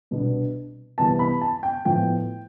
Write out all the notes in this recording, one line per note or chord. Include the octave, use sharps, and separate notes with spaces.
C2 B2 B3 D4
C2 C3 E3 B3 A5
B5
A5
G5
A2 F3 B3 E4 G5